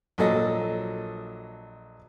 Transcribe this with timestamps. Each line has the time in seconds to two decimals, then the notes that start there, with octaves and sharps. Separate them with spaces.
0.18 A#1 F#3 A4 D#5